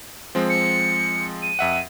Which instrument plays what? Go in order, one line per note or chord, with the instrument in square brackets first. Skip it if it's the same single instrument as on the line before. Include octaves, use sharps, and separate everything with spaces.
[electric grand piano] F3 G#3 C4
[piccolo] C#7
D#7
[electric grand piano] F2 E5 F#5